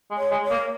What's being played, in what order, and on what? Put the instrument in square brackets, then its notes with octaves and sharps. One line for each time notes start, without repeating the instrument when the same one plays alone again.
[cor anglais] G#3
[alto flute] C#5
[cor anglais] G#3
[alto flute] C#5
[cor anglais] A#3